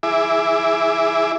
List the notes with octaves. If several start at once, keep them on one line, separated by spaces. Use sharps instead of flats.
E4 G#4 E5 D6